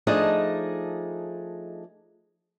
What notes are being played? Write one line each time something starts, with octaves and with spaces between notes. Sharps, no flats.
F3 A3 D4 D#4 G#4 D#5